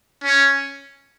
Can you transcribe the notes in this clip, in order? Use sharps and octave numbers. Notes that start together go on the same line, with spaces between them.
C#4